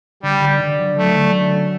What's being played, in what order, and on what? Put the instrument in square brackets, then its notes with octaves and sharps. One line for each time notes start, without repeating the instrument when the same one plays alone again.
[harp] D3 [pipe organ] G3
[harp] D3
D3
F#3
[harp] F#3 [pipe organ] A3
[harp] D3
C#4
C#4